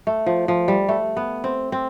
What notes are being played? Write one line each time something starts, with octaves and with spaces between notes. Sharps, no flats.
A3
F3
F3
G3
A3
B3
C4
C4